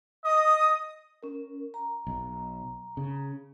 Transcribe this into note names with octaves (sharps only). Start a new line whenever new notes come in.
D#5 D#6
C#4 A#4
A#5
B1
C#3